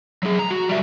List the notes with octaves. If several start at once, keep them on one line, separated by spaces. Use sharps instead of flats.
F#3 G#4
A#5
F#4
G3 E5